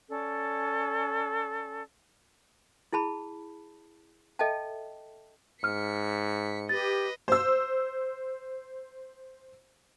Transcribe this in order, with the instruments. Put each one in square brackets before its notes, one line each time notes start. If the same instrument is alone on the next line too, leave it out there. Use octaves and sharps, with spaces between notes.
[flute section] C#4 A4 D5
[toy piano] E4 G#4 A5 B5
A4 D#5 E5 G5 A5
[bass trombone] G#2 [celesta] F6 [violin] B6 C#7
[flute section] G4 [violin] B4 D#5 [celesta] A6
[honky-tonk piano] C5 E6